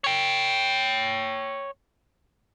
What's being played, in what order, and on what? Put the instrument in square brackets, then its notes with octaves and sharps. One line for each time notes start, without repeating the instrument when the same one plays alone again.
[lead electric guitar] C#5 G5